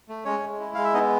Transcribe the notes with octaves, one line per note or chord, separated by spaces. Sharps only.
A3
G#3 C#4 C#5
G#3
E4
G#3 F5
E5
B3 D#4 D#5